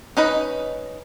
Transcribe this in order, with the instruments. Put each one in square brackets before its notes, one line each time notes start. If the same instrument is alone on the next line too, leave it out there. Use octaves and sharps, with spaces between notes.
[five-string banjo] C#4 D#4 B4 D#5